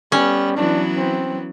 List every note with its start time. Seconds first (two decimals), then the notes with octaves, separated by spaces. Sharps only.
0.12 G3 B3 C#4
0.56 E3 F#3 B3 D4
0.97 C4